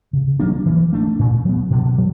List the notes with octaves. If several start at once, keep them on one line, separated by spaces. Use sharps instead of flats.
C#3
F#3 A#3 D4
E3
A3 D4
A#2
F#3 B3
B2
F#3